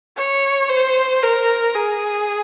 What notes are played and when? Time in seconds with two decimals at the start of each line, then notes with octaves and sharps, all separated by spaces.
0.17 C#5
0.69 C5
1.23 A#4
1.75 G#4